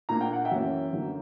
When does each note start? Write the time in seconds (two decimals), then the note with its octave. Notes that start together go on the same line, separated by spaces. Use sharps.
0.09 A#2 A#3 D4 A#5
0.21 G5
0.33 F#5
0.45 E5 G5
0.52 F#2 E3 A#3 C#4
0.93 F#2 D3 F#3 A#3